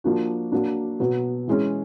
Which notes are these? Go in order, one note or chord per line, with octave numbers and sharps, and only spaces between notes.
F3 A#3 D4 F#4
F#3 A#3 D4
B2 F#3 B3
E3 G#3 C#4